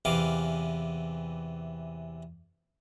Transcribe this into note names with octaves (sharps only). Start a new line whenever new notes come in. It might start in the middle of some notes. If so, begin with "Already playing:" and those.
E2 C3 E3 F5 D6